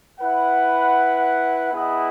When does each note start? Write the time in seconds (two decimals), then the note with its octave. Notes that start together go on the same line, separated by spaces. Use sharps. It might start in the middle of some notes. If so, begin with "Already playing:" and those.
0.19 E4 B4 F#5
1.72 B3 E4 G#4 D#5 F#5